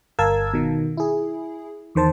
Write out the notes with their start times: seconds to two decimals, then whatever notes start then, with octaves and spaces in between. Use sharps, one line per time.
0.19 G1 A#4 F5 A5 E6 G#6
0.53 B2 D#3
0.97 E4 G#4
1.95 E2 D#3 C5 A5